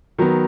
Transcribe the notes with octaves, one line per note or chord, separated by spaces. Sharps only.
D#3 F#3 B3